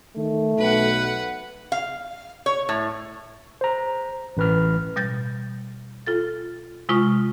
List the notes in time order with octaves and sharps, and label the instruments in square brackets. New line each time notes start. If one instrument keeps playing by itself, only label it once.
[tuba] D#3 [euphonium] A3
[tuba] B1 [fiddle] B4 F#5
[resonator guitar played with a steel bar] F5
C#5
A2
[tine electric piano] C5 A#5
A1 B4 F6
[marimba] B2 G3 G6 A6
F4 A4 A6
C3 G#3 F4 C#6 D#6 F6